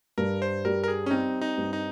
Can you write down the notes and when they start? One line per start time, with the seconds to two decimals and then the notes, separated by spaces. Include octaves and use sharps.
0.18 G2 A#4
0.42 C5
0.65 G3 A#4
0.84 A#4
0.88 G#4
1.06 C#4
1.11 C4 D#4
1.41 D#4
1.58 G2
1.73 D#4